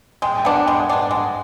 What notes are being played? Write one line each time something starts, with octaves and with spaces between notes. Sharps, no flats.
G#3 G5
G5
B3 D4 F#5
F#5
G#3 G5
G#5
B3 D4
F#5
G#3